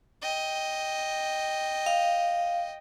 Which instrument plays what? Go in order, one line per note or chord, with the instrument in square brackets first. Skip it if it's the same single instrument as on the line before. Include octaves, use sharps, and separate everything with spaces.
[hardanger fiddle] D#5 G5
[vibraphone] F5